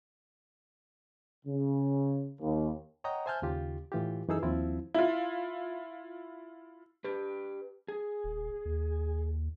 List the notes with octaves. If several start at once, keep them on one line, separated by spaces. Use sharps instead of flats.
C#3
D#2
C#5 D#5 F#5 G5 A#5 D#6
C5 E5 G#5 A5 F6 G6
D#2 C#3 F4 G4
A2 E3 F4 G4
F#2 E3 D#4 G#4 A4 E6
D#2 F3 C4 E4 F4
E4 F4
G4 B4
G#4
D#1
D#2